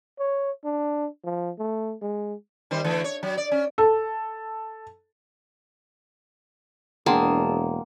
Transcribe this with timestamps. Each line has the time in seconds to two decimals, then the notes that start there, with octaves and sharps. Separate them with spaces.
0.19 C#5
0.64 D4
1.24 F3
1.59 A3
2.01 G#3
2.71 D#3 G3 C5
2.84 D3 E3 A3
3.04 C#5
3.23 F#3
3.37 D5
3.51 C#4
3.78 A4
7.06 E1 A#3 D4 G#4 F#5 G5 A5 C6